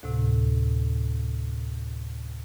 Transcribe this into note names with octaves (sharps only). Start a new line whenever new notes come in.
D2 A2 C3